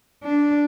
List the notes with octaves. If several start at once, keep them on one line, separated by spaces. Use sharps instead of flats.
D4